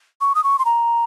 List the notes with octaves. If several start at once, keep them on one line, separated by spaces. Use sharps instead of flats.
C#6
D#6
C#6
C6
A#5